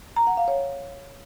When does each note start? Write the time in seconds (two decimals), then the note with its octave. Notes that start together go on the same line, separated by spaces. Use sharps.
0.16 A#5
0.27 F#5
0.37 F5
0.48 C#5